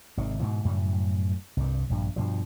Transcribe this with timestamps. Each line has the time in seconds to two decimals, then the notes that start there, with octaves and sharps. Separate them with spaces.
0.17 G#1 C3 D#3
0.40 G#2 B2 E3
0.65 F#2 A2 C#3 G3
1.57 C2 G2
1.90 A#1 G2
2.16 G2 B2 F3